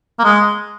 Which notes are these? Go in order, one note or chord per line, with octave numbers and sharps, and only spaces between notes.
A#3
G#3